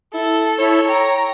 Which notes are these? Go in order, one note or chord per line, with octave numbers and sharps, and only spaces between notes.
E4 A4
E4 C#5
G5 A#5